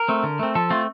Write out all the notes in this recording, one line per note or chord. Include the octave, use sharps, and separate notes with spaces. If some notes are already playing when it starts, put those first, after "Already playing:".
Already playing: A#4
A3 C4
D3
A3 C4
F3 A4
A3 C4 F4